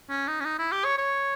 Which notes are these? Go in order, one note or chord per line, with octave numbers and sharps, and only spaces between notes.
C#4
D#4
C#4
D#4
E4
G4
C#5
C#5